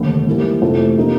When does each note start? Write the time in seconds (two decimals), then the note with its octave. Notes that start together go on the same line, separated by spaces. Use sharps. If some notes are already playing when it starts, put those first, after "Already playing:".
Already playing: F1 D#2 D3
0.27 G#2 E3 G3 A#3
0.61 F1 F2 C3 E3 A3
0.97 C3 F3 A#3 D#4